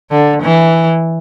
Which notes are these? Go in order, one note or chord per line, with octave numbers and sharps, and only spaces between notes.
D3
E3